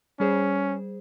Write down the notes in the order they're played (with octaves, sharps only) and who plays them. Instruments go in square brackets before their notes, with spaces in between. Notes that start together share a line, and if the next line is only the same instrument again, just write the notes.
[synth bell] G3 G#4 C5 [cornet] C#4